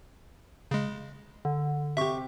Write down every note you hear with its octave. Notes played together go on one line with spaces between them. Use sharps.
C#3 G#3
D3
C3 G4 E5 C#6